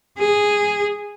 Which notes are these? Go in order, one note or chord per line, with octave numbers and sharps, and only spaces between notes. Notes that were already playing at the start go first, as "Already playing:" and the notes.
G#4